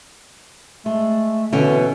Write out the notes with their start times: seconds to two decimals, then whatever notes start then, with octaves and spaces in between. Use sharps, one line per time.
0.86 G#3 A3
1.53 B2 D3 E3 C#4